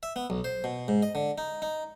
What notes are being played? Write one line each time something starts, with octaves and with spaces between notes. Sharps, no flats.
E5
B3
B1
C5
B2
G#2
D#5
D3
D#4
D#4